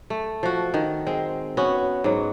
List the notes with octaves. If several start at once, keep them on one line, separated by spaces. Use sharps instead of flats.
A3
F3 F#4
D#3
G#3 C4
B3 C#4 F#4
G#2 F#3